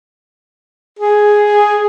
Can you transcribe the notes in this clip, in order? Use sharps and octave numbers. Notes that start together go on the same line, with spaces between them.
G#4